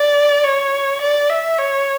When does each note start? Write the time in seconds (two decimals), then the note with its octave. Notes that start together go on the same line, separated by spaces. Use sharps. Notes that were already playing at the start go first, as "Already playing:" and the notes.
Already playing: D5
0.44 C#5
1.01 D5
1.29 E5
1.58 C#5